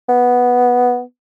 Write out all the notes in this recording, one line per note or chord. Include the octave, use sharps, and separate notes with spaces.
B3